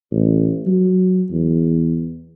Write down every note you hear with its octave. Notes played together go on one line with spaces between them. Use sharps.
A1
F#3
E2